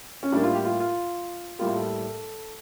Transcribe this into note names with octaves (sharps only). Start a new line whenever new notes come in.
C#4
A2 G3 A#3 D4
F4
G4
F4
F4
A2 G3 A#3 F4
A4